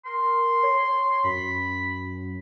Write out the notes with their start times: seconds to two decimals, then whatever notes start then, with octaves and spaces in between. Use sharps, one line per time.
0.05 A#4 C6
0.63 C#5
1.24 F#2 B5